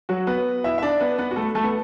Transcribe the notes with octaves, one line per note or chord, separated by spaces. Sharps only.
F#3 F#4
B3 B4
E4 E5
E5
D4 D5
B3 B4
B3 B4
F#4
A3 A4
A3 A4
B3